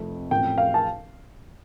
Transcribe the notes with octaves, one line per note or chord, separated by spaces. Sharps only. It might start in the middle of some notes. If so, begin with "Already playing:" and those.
Already playing: F1 F2 F3 A3
A1 A2 F3 A3 C4 G5
F5
A5